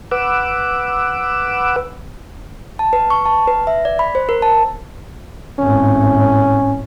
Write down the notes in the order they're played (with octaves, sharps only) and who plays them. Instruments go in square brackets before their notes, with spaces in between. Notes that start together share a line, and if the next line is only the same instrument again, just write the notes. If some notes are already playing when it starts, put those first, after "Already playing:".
[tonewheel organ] B4 F#5 D6 E6
[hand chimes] A5
B4
C#6
A5
B4
E5
D5
B5
C5
A#4
A5
[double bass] G#1 A2 [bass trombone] C#4